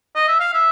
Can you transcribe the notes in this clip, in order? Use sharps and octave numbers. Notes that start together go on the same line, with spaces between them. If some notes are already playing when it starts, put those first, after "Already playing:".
D#5
E5
F5
E5